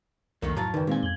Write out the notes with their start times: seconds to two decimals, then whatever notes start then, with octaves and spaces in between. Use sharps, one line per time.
0.42 C2 F2 D#3 A3 A#3
0.57 A2 F#3 F5 A5 A#5 A6
0.74 C#2 F#2 D#3 D#4 A#4 B4 D5 G5
0.87 A#2 G#3 A#3 C4 D#4 F5 G#5
1.03 F2 G#6 F#7 G7